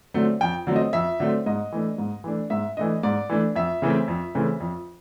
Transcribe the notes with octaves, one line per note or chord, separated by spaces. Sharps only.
D3 F#3 A3 C4
F2 G5
D3 F#3 A3 C4
D#5
F2 E5
D3 F#3 A3 C4
G#2 D#5
E3 A3 D4
G#2
E3 A3 D4
G#2 E5
E3 A3 D4 D#5
G#2 D5
E3 A3 D4
F2 E5
C#3 E3 A3 C4
F2
C#3 E3 A3 C4
F2